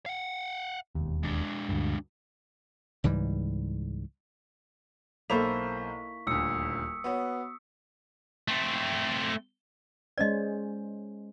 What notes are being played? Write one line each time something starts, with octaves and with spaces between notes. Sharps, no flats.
F5 F#5
E1 D#2
G#3 D4
D2 G2
C#2 G#2 E3 G3
B1 A#3 E4 A4 C5 C#6 B6 F7
D#1 D2 D#6 E6 C#7
B3 F#4 C#5
A3 C4
G#3 C#4 C5 D5 D#5